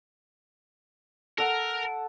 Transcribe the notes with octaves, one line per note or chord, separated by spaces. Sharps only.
A4 A#4 F#5